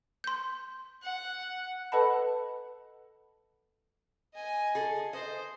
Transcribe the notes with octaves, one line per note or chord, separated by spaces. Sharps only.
C6 G6
F#5
A4 B4 D#5 F#5 A5 B5
D#5 G#5
G#4 A4
C5 D#5